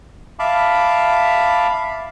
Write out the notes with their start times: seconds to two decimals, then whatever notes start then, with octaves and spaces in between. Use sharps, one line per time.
0.39 E5 F5 A5 B5 D6